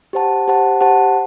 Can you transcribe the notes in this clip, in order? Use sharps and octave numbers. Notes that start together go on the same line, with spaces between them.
G4 C5 F#5 A5
G4 C5 F#5 A5
G4 C5 F#5 A5